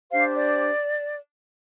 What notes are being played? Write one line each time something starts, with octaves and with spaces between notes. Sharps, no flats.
D4 G4 C5 F5
D5